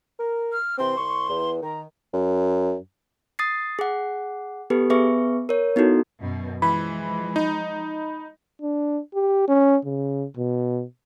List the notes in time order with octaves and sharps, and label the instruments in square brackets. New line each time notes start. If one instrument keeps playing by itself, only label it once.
[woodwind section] A#4
[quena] F6
[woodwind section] C3 E3 C4 [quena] C6
[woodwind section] C2 C#6
E2
[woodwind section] D#3 [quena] A#5
[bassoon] F#2
[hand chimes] D#6 A6 C7
G#4 F#5
B3 G4 A4 B4
B3 G#4 B4 E5 C#6
A#4 C#5
B3 D#4 E4 F#4 A4
[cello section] F#2 B2
[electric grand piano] E3 [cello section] F3 G#3 [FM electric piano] B5
[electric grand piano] D#4
[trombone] D4
G4
C#4
C#3
B2